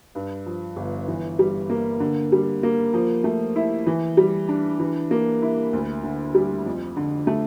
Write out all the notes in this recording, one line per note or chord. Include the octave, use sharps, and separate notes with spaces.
G2
F3
G1
E3
G3
A#3
D3
G3
A#3
F3
A3
E4
E3
G3
D4
E3
A#3
E4
D2
D3
G3
F2
D3
A3